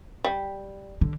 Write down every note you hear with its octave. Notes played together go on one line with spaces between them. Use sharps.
G3
D3